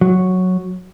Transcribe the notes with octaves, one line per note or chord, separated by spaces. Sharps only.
F#3